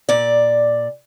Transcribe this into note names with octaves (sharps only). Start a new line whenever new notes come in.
A#2 D5